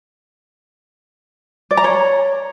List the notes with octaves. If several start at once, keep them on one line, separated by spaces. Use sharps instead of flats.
D5
A#5
C#5